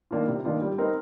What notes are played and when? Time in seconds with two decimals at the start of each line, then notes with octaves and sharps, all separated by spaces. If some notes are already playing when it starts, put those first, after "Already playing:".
0.11 D#3 A#3 D4 F4
0.28 C3
0.45 D#3 A#3 D4 F4
0.61 G3
0.78 C4 D#4 A#4